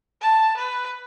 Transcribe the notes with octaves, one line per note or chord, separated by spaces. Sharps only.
A5
B4